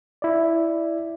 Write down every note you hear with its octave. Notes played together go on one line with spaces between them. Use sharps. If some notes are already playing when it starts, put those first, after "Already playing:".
E4 D5